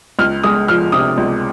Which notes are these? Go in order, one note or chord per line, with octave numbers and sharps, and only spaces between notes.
C#2 F6
G#3 D#6
F3 F6
C3 D#6
C#2